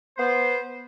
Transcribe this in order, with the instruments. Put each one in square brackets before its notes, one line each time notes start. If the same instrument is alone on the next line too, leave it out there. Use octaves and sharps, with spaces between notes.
[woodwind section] B3 C5